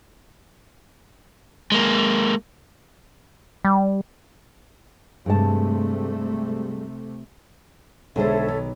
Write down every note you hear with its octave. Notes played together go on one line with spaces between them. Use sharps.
G#3 A#3
G3
G2 C3 G#3 A3 A5
B1 D3 G#3 A4 C5 C#5 E5
D#3